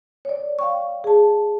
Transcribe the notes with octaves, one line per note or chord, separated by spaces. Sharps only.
C#5 D5
F5 G5 C#6
G#4 A5